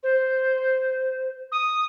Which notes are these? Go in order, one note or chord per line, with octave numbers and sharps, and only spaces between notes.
C5
D#6